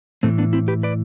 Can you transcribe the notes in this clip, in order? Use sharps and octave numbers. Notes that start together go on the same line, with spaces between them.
A2 E3 A3 C4
B3 D4
C4 E4
G4 B4
B4 D5